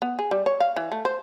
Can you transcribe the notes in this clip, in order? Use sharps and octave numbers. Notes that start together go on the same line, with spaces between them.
B3
G#4
G3
C#5
F5
E3
A3
C5